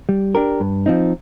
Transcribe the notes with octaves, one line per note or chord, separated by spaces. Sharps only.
G3
D4 G4 A#4
G2
F3 C4 D#4